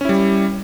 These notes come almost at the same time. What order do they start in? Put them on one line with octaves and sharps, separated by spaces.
C#4 E4 G3